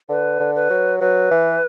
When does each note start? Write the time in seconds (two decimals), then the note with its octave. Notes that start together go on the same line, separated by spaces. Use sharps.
0.09 D3 B4
0.40 D3
0.55 B4
0.70 F#3
1.00 F#3 B4
1.31 E3